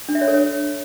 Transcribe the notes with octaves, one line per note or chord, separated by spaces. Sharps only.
D4
E5
C#5
A4
C#5